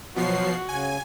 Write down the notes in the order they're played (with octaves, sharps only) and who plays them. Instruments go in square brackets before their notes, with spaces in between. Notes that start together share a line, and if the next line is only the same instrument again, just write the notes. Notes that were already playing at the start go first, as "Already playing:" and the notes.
[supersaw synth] B2 F3 C7 [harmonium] F#3 [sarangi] F#4
[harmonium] C#3 [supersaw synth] G#5